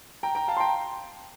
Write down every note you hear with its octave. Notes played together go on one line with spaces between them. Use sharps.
G5 A#5
G5 A#5
F5 A5
C6
G5 A#5